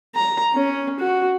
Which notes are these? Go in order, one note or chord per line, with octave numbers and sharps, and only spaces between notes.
A#5
C#4
F#4